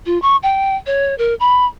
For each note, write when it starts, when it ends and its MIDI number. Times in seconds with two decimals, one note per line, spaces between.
0.06 0.20 65
0.22 0.36 85
0.43 0.76 79
0.86 1.16 73
1.18 1.34 70
1.40 1.66 83